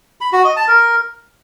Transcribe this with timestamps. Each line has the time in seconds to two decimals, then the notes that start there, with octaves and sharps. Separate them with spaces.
0.21 B5
0.33 F#4
0.44 D#5
0.56 A5
0.68 A#4